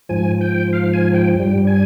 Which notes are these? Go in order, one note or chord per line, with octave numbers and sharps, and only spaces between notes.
G#2 F3 G#5
G5
F5
G#5
G5
G2 G3 G5
G#5